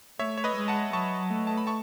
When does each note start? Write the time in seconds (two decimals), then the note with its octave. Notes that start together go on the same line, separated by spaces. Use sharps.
0.19 A3 C#5 E5
0.38 C#5
0.44 B4 D#5
0.56 G#3
0.68 F#5 A5
0.93 F#3 A5 C#6
1.30 A3
1.47 A5
1.58 B5
1.67 A5 C#6